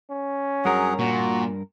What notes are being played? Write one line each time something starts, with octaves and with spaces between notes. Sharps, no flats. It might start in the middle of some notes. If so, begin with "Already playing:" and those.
C#4
G2 F#3 G#4 A#4 F#5
A#2 F#4